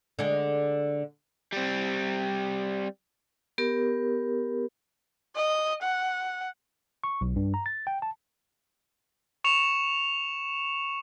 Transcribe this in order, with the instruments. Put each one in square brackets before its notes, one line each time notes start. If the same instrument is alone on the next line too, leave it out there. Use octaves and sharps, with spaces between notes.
[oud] D3 G#3
[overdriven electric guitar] G3 C4
[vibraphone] B3 G4 A#4
[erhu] D#5
F#5
[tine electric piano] C#6
B1
G2
A#5
A6
G5
A5
[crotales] C#6 C#7 E7 F7